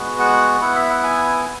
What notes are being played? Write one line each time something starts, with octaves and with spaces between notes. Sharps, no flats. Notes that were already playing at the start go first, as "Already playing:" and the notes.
Already playing: G#3 B3 F#4
F#5
B3 E4 F#5
E5
F#5
G#5